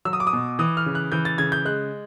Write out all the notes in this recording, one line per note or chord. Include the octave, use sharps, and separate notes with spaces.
F#3 E6
D#6
D6
D#6
B2
E3 D#6
F6
C#3
F#6
E3 G6
A6
C#3 G#6
G6
G#3 F#6